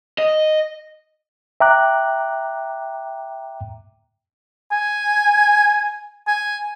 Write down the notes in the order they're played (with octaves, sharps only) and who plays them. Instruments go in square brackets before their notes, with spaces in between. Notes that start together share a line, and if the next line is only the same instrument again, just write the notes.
[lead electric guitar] D#5
[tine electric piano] E5 G5 A#5 D6 F#6
[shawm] G#5
G#5